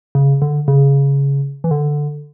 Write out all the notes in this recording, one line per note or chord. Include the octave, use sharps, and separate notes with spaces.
C#3
D3
C#3
E3
D3